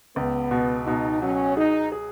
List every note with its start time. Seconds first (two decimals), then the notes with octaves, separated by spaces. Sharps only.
0.16 C#2 B3
0.51 B2
0.87 B2 D#4
1.22 F#3 C#4
1.57 D#4 G#4
1.92 G#4